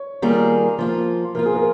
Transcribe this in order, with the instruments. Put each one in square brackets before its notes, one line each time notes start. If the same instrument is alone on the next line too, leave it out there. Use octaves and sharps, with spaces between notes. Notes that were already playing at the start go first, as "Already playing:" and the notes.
Already playing: [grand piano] C#5
[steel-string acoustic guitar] D#3 G3 A#3 F4 G#4
F3 A#3 F4
[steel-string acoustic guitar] F3 A#3 F4 [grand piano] A#4
[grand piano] G#4
A#4